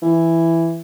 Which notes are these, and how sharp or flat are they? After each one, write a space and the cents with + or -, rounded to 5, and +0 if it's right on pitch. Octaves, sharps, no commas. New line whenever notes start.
E3 +5